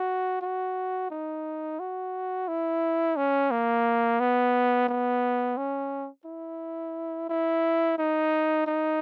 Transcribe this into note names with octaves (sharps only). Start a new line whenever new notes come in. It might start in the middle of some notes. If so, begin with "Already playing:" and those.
Already playing: F#4
F#4
D#4
F#4
E4
C#4
A#3
B3
B3
C#4
E4
E4
D#4
D#4